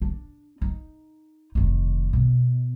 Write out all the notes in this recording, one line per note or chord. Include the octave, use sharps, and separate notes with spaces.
D4
D#4
F1 D#3
B2